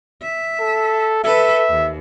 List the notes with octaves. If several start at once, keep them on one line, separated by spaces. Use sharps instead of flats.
E5
A4
A4 B4 E5
D#2